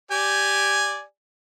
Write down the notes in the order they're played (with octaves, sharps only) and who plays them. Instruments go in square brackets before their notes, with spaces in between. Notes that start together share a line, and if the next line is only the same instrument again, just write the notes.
[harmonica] G4 D5 G#5